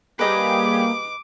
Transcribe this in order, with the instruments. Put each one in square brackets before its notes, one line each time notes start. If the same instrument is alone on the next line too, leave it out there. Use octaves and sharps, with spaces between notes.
[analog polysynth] G3 G4 G#4 [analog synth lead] A#3 [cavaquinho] B4 D#5 [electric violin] D6